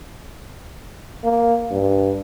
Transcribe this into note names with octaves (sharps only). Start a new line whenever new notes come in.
A#3
G2